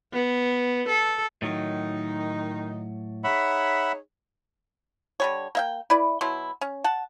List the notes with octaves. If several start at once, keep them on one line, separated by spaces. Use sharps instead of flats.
B3
A4
A2 D#3 F#3 D#4
D#4 G#4 C#5 E5 F#5 B5
D3 G3 C#5
A#3 E5 G5
E4 B4 D5
B2 F#3 E4 C6
C#4
F#5 A5